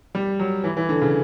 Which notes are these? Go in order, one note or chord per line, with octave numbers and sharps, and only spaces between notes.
G3
F#3
E3
E3
D3
C#3